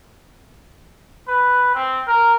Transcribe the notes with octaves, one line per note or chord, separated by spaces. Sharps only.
B4
C4
A#4